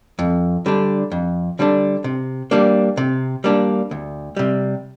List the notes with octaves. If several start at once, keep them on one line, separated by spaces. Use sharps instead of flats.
F2
D3 G3 D4
F2
D3 G3 D4
C3
G3 A#3 D4
C3
G3 A#3 D4
D2
C3 G3